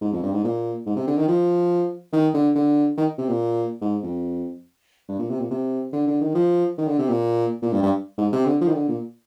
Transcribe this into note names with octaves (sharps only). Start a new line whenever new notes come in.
G#2
F2
G2
G#2
A#2
G#2
C3
D3
D#3
F3
D#3
D3
D3
D#3
C3
A#2
G#2
F2
G2
A#2
C3
A#2
C3
D3
D3
D#3
F3
D#3
D3
C3
A#2
A#2
G2
G2
G#2
C3
D3
F3
D#3
D3
A#2